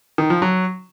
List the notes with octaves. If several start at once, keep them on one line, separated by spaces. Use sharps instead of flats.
D#3
F3
F#3